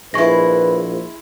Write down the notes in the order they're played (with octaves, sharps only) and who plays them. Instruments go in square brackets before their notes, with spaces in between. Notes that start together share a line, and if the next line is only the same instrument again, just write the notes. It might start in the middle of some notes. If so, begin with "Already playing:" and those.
[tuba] A#1 [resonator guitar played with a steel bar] G#3 E4 [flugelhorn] B4 [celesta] C#6 A#6